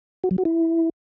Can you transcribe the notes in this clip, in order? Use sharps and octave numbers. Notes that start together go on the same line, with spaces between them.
F#4
F#3
F#4
E4